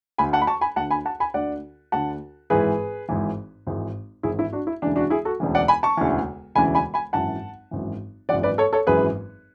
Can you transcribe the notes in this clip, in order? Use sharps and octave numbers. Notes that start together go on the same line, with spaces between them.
D2 D3 G#5 B5
F#5 A5
B5
A5 C#6
G#5 B5
D2 D3 F#5 A5
G#5 B5
F#5 A5
G#5 B5
D2 D3 D5 F#5
D2 D3 F#5 A5
G#1 G#2 E3 G#4 B4
G#1 G#2 E3
G#1 G#2 E3
G#1 G#2 E3 E4 G#4
E4
D4 F#4
E4
E1 D2 C#3 E3 D4
D4 F#4
E4 G#4
F#4 A4
E1 D2 C#3 E3
D5 F#5
G#5 B5
A5 C#6
E1 D2 C#3 E3
E1 D2 C#3 E3 G#5 B5
G#5 B5
G#5 B5
G#1 F#2 E3 F#5 A5
G#1 F#2 E3
G#1 F#2 E3 D5 F#5
B4 D5
A4 C#5
A4 C#5
G#1 F#2 E3 G#4 B4